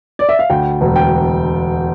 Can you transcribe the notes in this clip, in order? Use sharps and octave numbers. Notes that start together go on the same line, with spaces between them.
D5
E5
F5
D2 G5
E1
G5